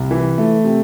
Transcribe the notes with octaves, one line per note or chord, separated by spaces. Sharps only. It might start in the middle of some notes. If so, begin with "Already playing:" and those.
Already playing: C2
E3
A3
C3